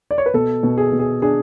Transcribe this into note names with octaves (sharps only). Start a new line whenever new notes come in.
D5
C#5
B4
B2 A4
B2
G#4
B2
G#4
D4 G#4